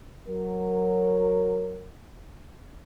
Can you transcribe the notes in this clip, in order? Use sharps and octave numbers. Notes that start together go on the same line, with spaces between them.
F#3 A#4